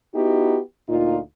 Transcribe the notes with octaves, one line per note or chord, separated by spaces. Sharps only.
B3 D#4 E4 F#4 G4
D2 A#2 D#4 F4